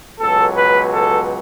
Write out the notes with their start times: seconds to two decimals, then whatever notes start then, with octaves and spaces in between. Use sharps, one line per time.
0.19 C#2 B2 F#3 A4
0.56 B4
0.93 A4